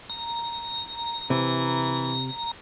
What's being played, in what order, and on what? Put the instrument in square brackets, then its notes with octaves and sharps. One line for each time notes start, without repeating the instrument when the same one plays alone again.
[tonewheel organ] A#5
[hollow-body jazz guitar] C3 [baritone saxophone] E3